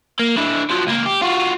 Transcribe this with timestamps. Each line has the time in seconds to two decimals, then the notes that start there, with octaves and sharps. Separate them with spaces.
0.19 A#3
0.38 D3 E4
0.71 F3 F#3
0.87 C#2 A#3
1.06 G4
1.22 F4 F#4